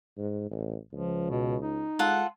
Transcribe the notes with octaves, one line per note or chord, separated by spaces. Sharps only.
G#2
A1
C#2 F3
B2
D#4
G#3 F4 A4 F#5